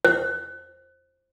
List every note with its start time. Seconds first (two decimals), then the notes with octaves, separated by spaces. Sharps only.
0.05 C5